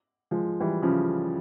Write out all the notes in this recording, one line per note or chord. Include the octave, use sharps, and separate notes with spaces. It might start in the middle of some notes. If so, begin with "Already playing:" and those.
F3 G#3
E3 G3
C#3 F3